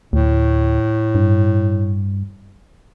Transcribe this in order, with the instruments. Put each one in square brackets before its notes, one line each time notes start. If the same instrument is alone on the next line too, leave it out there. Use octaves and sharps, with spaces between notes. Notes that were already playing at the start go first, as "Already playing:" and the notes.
[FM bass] D2 [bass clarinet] A2
[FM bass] G2